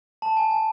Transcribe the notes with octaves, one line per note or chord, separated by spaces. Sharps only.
A5
G#5
G#5